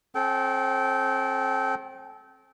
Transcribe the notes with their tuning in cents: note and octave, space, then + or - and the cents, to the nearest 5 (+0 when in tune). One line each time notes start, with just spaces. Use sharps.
C4 +35 A4 -30 G5 -25